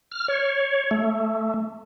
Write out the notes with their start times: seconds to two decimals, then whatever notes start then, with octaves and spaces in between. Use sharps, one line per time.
0.11 F6
0.28 C#5
0.91 A3